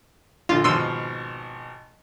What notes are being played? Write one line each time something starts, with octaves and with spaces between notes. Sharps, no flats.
A#1 D3 F4
G#1 B2 F3 C6 E6 D#7